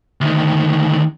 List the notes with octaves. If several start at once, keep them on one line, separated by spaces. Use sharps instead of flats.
D2 D#3